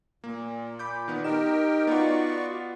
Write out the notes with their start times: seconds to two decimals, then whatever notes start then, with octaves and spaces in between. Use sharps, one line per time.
0.24 A#2 A#3
0.79 B5 D6 G6
1.08 D#3 B3
1.24 D#4 G4 A#4 G5 E7
1.87 B3 F4 F#4 D5 C#6